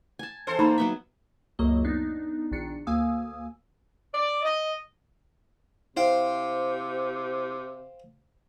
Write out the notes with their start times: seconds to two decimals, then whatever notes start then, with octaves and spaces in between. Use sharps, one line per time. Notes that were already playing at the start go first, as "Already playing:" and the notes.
0.19 G#5 A5
0.47 E2 A4 C5
0.59 A#3 D#4 B5
0.78 F#3 B3 E5
1.59 C#2 F#2 F#3 A#3 D#5
1.85 B3 D4 D#4
2.52 A#1 D#3 D4 C#7
2.87 D2 A#3 F5 G#5 D#6 E6
4.14 D5
4.43 D#5
5.97 C3 E4 C5 F5 G5